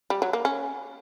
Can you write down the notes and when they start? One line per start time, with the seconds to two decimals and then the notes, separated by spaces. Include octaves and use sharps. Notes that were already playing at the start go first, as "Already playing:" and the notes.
0.10 G3
0.22 F#3
0.33 A#3
0.45 C#4